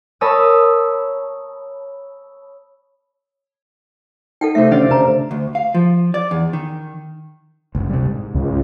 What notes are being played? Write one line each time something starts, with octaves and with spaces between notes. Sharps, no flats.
A#4 C#5 A5 B5 D#6 E6
D#4 A4 F#5 G5
C3 A3 E5
D#3 C#4 D4 D5 F5 G5
C#3 D4 B4 A#5
D2
F5
F3
D5
E2
D#3
F#1 C#2
C3 G3
G#2
C#2